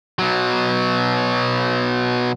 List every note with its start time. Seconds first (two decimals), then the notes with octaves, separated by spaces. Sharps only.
0.19 B2 F#3